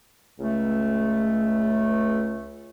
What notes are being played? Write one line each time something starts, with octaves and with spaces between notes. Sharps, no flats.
C#2 A3